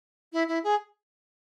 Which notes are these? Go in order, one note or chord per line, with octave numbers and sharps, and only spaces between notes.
E4
E4
G#4